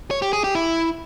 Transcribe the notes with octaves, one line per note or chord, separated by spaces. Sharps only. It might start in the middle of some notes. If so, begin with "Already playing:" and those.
C#5
G4
G#4
G4
E4